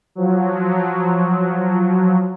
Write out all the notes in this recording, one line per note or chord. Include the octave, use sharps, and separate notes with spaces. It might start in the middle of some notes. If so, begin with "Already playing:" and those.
F3 F#3